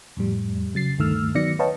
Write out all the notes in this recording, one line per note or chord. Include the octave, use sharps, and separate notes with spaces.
F2 A2 G3
C#3 F#3 A6 C7
D2 G2 D#3 A3 E6 F6
D#3 F#3 B3 D5 A#6 C#7
B4 C#5 D#5 F5 G5 A5